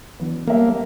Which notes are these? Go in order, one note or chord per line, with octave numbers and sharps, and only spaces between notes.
C#3 E3 F#3 B3 D4
F#3 G3 A#3 B3 A4 E5